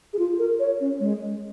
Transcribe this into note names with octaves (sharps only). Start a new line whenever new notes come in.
G#4
F4
A#4
C#5
C#4
G#3